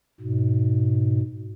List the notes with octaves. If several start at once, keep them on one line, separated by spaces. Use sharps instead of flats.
G#2 B2